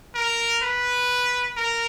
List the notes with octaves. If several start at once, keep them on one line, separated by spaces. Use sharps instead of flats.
A#4
B4
A#4